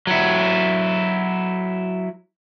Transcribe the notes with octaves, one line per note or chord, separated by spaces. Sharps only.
F#3 E4